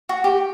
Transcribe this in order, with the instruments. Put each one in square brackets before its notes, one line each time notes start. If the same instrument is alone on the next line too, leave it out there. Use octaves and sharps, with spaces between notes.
[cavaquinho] F#4
G4